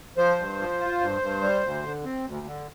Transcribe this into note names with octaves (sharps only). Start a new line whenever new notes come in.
F3 C5
G2
F3
F4
G2
G2
G3
D2
D3
C4
D2
D3